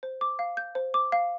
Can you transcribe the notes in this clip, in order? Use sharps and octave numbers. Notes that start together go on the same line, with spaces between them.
C5
D6
F5
G6
C5
D6
F5